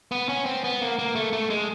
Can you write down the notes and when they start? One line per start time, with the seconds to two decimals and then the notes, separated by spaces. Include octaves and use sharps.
0.12 B3
0.29 C#4
0.46 C4
0.64 B3
0.81 A#3
0.99 A#3
1.15 A3
1.33 A3
1.50 G#3